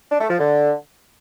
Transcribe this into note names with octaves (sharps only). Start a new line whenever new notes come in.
D4
A3
F3
D3